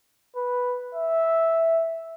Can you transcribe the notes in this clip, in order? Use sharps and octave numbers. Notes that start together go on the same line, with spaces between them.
B4
E5